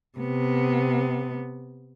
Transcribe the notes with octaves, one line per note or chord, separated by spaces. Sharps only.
C3 B3